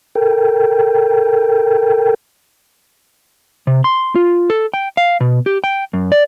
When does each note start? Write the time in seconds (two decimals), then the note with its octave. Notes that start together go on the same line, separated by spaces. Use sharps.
0.15 A4 A#4 G5
3.67 C3
3.84 C6
4.15 F4
4.50 A4
4.74 G5
4.97 F5
5.20 B2
5.46 G4
5.64 G5
5.93 F#2
6.12 D5